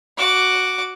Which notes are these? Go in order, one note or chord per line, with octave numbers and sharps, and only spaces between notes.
F#4 D6